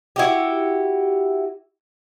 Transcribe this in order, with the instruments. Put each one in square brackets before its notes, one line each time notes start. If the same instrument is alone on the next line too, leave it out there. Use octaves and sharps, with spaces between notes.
[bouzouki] E4 F#4 G4